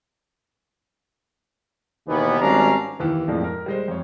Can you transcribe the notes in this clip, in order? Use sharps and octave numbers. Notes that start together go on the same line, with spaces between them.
D#2 B2 D#3 E3 B3
G#1 G3 C#4 D4 F5 A#5
D#2 E3
F2 A2 F3 G#3 A#3 D4
A#4
G3 G#3 C5
F2 C#5